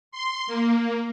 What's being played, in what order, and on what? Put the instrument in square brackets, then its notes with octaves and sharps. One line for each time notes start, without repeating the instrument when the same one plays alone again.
[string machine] C6
A#3